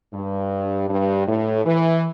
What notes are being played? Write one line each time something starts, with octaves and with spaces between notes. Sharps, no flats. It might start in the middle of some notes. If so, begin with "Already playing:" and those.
G2
G2
A2
E3